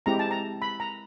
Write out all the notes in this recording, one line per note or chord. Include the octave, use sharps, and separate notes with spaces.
G#3 C4 E4 G4 A#5
A5
A#5
B5
A#5